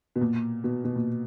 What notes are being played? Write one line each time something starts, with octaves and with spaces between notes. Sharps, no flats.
B2
A#2
B2
B2
A#2